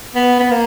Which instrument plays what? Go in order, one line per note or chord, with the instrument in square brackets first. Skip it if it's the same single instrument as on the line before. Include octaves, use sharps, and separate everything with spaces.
[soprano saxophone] B3
B3
A#3